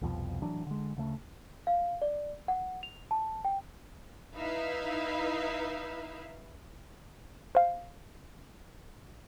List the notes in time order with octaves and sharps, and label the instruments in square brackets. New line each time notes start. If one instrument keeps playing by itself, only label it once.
[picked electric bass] C2 F2 B2 F3
A1 E3 F#3 D4
D3 G#3
D2 C#3 A3
[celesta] F5
D5
F#5
F7
A5
G5
[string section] D#4 E4 B4 E5 F5
[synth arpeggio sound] C5 F5